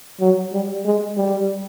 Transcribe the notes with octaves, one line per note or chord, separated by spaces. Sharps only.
F#3
G3
G#3
G3